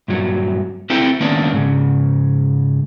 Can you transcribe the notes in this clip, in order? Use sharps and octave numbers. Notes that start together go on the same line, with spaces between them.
G2 A#2 F#3
C4 E4 G4 A4 C5
D#3 A#3 B3 C#4 D4
G#2 C#3